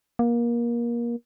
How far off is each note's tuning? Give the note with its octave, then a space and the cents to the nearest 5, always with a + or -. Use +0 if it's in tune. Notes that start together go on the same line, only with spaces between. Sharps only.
A#3 +25